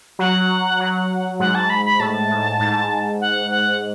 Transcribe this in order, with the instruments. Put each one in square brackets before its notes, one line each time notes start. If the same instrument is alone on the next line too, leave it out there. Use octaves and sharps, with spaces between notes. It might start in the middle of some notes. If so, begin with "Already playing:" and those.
[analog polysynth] F#3 [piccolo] F#5
[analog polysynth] F#3
[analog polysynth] G#2 [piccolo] F#5
[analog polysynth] G#2 [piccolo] A5
[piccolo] B5
B5
[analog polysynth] A2 [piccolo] A5
[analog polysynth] G#2
G#2
[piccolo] F#5
F#5